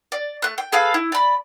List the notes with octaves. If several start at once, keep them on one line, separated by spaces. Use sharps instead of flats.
D5
A3 F#6
G5
G#4 A4 B4 F5
E4
D5 B5